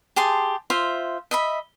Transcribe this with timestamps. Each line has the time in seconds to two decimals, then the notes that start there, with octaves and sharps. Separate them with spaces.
0.16 G4 G#4 A5 C6
0.70 F4 C5 E5
1.31 D#5 E5 B5